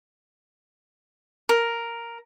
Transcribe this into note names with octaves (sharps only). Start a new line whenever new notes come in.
A#4